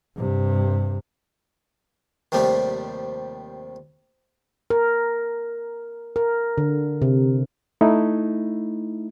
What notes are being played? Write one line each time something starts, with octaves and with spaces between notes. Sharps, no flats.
G2 C3
D#2 C3 F3 G3 A3
A#4
A#4
D3
C3
A3 D#4 E4